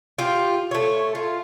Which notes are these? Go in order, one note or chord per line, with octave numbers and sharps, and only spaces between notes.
F4 G4
A3 C#5
F4